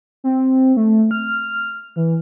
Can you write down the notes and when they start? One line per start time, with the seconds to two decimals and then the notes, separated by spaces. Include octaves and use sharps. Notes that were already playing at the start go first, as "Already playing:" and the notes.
0.24 C4
0.77 A3
1.11 F6
1.96 E3